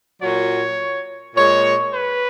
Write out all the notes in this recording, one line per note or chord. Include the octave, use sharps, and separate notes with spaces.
A#2 F#3 C#5
A#2 G#3 C#5
B4